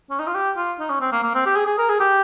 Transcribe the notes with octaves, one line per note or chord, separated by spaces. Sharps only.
C#4
D#4
F4
G4
F4
D#4
C#4
C4
A#3
A#3
C4
G4
G#4
G#4
A#4
G#4
G4